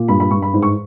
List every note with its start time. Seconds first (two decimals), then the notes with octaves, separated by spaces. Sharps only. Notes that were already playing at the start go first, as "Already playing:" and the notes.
Already playing: A#2
0.08 G2 B5
0.20 B5
0.31 G2 C#6
0.42 B5
0.54 G#2
0.62 C#6